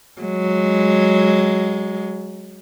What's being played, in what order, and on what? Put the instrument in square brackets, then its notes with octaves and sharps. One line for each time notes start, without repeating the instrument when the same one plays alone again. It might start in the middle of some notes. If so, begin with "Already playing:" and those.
[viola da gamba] F#3 G#3